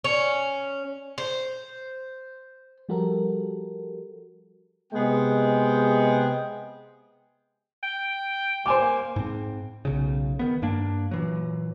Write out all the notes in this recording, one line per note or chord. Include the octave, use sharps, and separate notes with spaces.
C#4
C5
F3 G3 F#4 G4 A4 A#4
C3 G#3 B3 G#4 G5
G5
G3 C5 G#5 D6
A#3
G#2 C4
B1 C#3
D#3 B3
G2 A#3 D4
A#2 E3 F#3